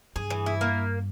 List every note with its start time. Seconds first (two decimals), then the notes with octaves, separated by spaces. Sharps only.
0.16 G2 G#4
0.30 E3
0.46 E4
0.61 A#3